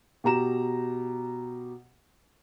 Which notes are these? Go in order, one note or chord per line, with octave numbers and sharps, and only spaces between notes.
B2 G4 A#5 E7